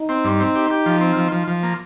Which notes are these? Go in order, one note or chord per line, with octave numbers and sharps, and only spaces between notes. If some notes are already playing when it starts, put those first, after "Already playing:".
Already playing: D#4
C4
G2
C4
G4
G4
F3
C4
F3
F3
F3
A#3